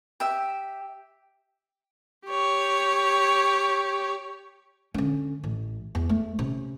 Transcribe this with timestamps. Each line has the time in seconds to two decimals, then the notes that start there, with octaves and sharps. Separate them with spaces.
0.20 G4 E5
2.26 G4 C#5
4.94 D3 C#4
5.44 A1
5.95 E2
6.09 A3
6.39 C3 C#4